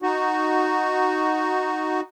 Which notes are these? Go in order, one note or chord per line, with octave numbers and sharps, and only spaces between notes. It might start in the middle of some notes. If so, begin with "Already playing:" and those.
D#4 F#4